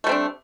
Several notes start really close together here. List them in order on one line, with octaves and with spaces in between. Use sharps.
A3 G3 C4 D4